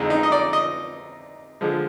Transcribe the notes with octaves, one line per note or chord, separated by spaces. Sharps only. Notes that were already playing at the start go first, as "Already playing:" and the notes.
Already playing: F2 D3 G#3 D#4
D#4
D#5
D5
D#5
D3 F3 G#3